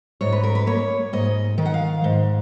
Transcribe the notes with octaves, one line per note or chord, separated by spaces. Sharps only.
G#2 C#5
B4
A#4
B4
A#3 C#5
G#2 D#5
D#3
F#5
F5
G#2